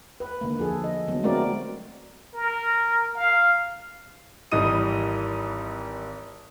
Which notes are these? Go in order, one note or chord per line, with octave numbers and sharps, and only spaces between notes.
B4
D3 A#3
F3 G#4 A4
D#5
D3 F#3 B3
G#3 A3 C4 F#4 A#4 D5
A#4
F5
G#1 E3 G3 D#5 D#6 D#7